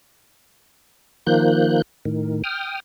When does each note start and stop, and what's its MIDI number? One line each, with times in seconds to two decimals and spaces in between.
1.27 1.82 51
1.27 1.82 53
1.27 1.82 58
1.27 1.82 90
1.27 1.82 91
2.05 2.42 45
2.05 2.42 51
2.44 2.80 79
2.44 2.80 87
2.44 2.80 89